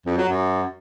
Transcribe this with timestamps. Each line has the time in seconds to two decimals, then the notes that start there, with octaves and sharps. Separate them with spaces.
0.06 F2
0.17 F#3
0.29 F#2